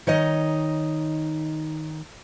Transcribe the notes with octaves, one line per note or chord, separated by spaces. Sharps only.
D#3 D#4 C#5 D#5